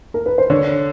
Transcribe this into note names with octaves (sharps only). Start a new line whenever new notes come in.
A#4
B4
C5
D3 C#5